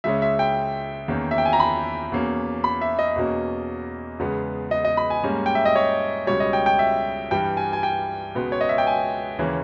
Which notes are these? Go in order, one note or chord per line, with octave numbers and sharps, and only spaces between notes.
C#2 C#3 G#3 C#4 E5
E5
G5
E2 D#3 A#3 C#4
E5
G5
G#5
A#5
B5
E2 B2 A#3 C#4
B5
E5
D#5
E2 B2 A#3 C#4
E2 C#3 G#3 B3
D#5
D#5
B5
G#5
G#2 G3 A#3 C#4
G5
E5
D#5
C#5
C#2 B2 G3 C#5
D#5
G5
G5
E5
G2 E3 G3 G5
G#5
G#5
G5
C#2 B2 G#3 B3
C#5
D#5
E5
G5
G#5
D#2 C#3 E3 A#3 C#4